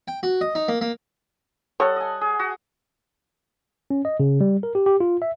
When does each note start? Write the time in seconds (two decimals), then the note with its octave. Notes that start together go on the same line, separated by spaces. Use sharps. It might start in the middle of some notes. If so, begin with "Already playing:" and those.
0.08 G5
0.23 F#4
0.41 D#5
0.55 D#4
0.68 A#3
0.81 A#3
1.80 G3 A4 C#5 D#5 F#5
1.96 D#5 G#5
2.21 G#4
2.39 F#4
3.90 C#4
4.05 D#5
4.20 C#3
4.41 G3
4.63 A#4
4.75 G4
4.86 G4
5.00 F4
5.22 E5